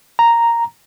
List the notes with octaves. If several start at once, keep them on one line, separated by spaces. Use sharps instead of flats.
A#5